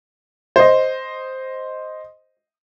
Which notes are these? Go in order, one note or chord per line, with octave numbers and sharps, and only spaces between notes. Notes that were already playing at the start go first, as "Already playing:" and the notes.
C5 D#5